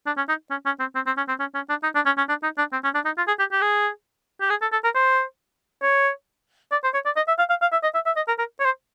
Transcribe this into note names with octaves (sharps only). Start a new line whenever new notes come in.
D4
C#4
D#4
C#4
C#4
C4
C4
C4
C#4
C4
C#4
C#4
D4
D#4
D4
C#4
C#4
D4
D#4
D4
C4
C#4
D4
D#4
F4
G#4
G4
G4
G#4
G4
G#4
A4
A4
A#4
C5
C#5
D5
C5
C#5
D5
D#5
E5
F5
F5
F5
E5
D#5
E5
E5
D#5
A#4
A#4
C#5
C5